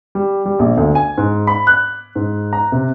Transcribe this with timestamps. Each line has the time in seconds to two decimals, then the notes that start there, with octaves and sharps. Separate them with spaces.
0.15 G3
0.46 G3
0.59 A#1
0.77 D2
0.95 G#5
1.18 G#2
1.47 B5
1.67 F#6
2.15 G#2
2.53 A#5
2.72 C3